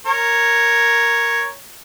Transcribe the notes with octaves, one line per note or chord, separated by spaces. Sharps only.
A#4 C#5